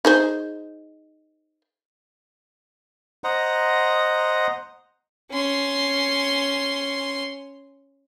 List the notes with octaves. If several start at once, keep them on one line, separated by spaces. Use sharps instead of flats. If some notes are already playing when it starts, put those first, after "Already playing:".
D#4 G#4 C5
C5 D#5 F#5 A#5
C#4 C6